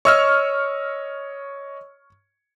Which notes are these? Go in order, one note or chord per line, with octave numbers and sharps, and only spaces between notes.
C#5 D#5 C#6 E6 F6